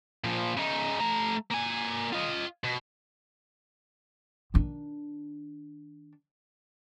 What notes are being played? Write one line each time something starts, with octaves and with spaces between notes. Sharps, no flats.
A#2 F3
C#3 D#4
A3 A#5
A#3 G#5
F4 D#5
B2
D#3 D4